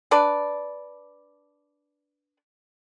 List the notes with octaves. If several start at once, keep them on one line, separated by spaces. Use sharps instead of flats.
D4 B4 D5